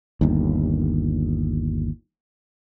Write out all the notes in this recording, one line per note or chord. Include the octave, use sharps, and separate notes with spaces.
G1 D#2